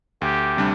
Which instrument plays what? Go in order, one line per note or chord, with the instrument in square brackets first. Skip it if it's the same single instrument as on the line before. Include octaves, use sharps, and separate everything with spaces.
[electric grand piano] D2 [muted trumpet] G4
[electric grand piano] C3 G3 D4